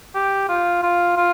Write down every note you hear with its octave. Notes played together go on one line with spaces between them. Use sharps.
G4
F4
F4
F4